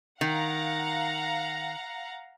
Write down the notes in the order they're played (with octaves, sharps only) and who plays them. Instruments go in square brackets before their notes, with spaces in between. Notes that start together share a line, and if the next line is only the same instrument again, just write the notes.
[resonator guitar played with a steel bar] D#3 [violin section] F5 F#5 A#5